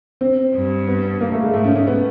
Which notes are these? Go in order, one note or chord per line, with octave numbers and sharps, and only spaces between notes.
C4
G2
B3
A#3
A3
G#3
G#2 A3
C#4
C#4
B3